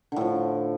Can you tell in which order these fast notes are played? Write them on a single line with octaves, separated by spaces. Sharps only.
D3 A2 F3